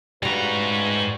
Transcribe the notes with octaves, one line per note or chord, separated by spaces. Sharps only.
G#2 C#3 G3 A3 F#4 B4 A#5